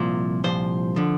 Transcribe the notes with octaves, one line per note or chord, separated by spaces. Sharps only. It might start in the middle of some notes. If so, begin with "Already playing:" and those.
Already playing: C2 A#2 F3
C2 A#2 F3 C5
D3 F3